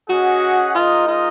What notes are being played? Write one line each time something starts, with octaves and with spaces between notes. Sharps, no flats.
C#4 F#4 G#4 D#5 F#5
G#3 D#4 F4 A#4 D#5
F4